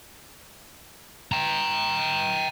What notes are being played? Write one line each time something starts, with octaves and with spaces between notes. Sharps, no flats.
G5 A#5